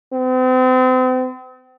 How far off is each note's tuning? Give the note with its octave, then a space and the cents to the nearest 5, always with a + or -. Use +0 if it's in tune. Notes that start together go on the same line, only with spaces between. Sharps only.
C4 -40